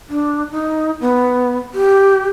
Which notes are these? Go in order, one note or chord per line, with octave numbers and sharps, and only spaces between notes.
D4
D#4
B3
G4